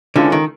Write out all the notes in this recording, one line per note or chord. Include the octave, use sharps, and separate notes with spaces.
D3 E3 G#3 C#4 F4 A4
D#3